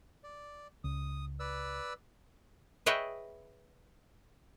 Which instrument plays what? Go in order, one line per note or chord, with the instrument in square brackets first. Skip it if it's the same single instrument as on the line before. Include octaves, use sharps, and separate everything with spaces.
[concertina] D5
[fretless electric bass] C#2 [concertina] D#6
[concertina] B4 D5 E6
[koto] G#4 B4 C#5 D#5 E5 G5